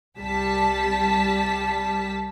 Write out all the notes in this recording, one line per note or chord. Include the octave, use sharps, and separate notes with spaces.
C2 G3 A5 B6